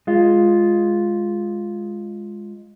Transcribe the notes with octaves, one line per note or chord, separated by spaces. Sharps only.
G#3 F4